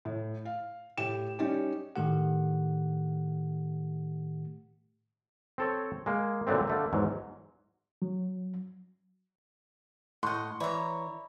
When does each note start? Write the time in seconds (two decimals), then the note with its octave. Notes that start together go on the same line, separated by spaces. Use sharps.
0.05 A2
0.45 F5
0.98 A2 G4 E7
1.39 G3 C#4 D#4 G4
1.96 A2 D#3 A3 G4 F#5
5.58 C4 A4 C#5
6.06 G#3 A#3
6.47 A#2 D3 F#3 A3 C4
6.68 D3 A3 A#3
6.93 E2 G#2 F#3
8.02 F#3
10.23 A2 D#5 F#5 C6 C#6
10.60 E3 C#5 D5 E5 A#5 B5